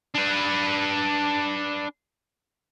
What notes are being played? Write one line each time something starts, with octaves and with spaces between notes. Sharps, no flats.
D4 B4